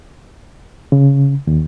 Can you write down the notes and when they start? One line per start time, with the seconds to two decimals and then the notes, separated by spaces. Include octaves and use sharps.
0.92 C#3
1.47 D#2